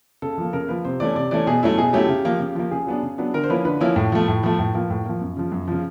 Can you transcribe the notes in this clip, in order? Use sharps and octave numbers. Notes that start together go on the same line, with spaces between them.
C#3 A4
F3 A#3
C#3 A#4
F3 A#3 B4
C3 C5
E3 A3 C#4 D5
C3 D5
E3 A3 C#4 D5
B2 G#4
F#3 A3 C#4 E4
B2 G#4
F#3 A3 C#4 E4 G4
C#3
F3 A#3
C#3
F3 A#3
C#3 G#4
F#3 B3 D4
C#3
F#3 B3 D4
D3 A#4
C5
F3 A#3 C#4 E4 B4
D3 B4
F3 A#3 C#4 E4
A2
F3 A3
A2
F3 A3
A2
F3 A#3
A2
F3 A#3
F#2
C#3 F3
F#2
C#3 F3